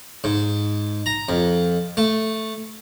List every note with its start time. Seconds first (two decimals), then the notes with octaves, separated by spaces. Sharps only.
0.24 G#2
1.06 A#5
1.29 F2
1.97 A3